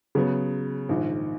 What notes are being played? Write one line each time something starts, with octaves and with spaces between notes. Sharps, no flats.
C#3 F#3 B3
A#1 G#2 D#3